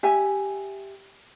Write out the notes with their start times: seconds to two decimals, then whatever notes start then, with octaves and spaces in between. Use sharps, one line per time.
0.03 G4 E5 G#5